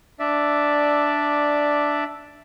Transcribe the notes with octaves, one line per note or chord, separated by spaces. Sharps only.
D4 D5 E5